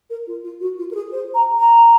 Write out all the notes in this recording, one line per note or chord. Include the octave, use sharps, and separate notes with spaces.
A#4
F4
F4
F#4
F4
A#4
G#4
C5
A#5
A#5